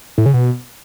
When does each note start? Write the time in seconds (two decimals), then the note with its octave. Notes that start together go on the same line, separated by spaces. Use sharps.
0.18 A2
0.26 C#3
0.34 B2